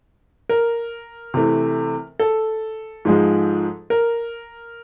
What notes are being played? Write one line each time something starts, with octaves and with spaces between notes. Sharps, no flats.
A#4
C3 E3 A3
A4
G#2 F3 G#3
A#4